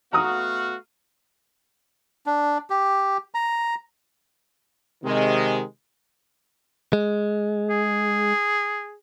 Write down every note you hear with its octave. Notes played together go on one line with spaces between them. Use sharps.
A3 B3 F#4 F5 A#5 D#6
D4
G4
A#5
C3 D#3 G#3
G#3
G#4